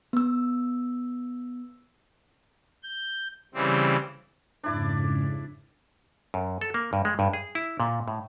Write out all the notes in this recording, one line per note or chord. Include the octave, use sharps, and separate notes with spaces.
B3 E6
G6
C#3 E3 G3 C4
F2 G#2 C#3 D4 E4 D5
F#2
A4
A#3
G2
G#3
G2
G#4
E4
A#2
A2